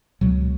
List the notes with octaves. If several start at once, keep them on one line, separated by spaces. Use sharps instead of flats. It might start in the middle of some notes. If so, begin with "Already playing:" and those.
C#2 B2 F#3